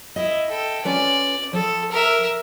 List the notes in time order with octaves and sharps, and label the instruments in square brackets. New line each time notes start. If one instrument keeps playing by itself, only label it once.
[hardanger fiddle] E4 [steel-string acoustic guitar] D#5 E5
[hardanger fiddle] A4 G5
[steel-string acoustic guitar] C#4 F4 B4 [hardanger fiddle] D5
[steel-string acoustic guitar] F3 [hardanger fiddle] A4
[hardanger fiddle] A#4 E5